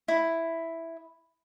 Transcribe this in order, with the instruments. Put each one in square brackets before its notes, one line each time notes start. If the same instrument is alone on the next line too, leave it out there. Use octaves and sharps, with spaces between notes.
[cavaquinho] E4